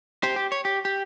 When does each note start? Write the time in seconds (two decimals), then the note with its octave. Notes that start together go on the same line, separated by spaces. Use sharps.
0.23 G4 C5
0.36 G4
0.52 C#5
0.65 G4
0.85 G4